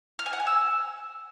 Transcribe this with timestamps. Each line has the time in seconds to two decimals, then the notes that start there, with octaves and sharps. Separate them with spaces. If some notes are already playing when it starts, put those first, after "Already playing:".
0.19 F6
0.26 G#5
0.33 F#5
0.40 G#5
0.47 E6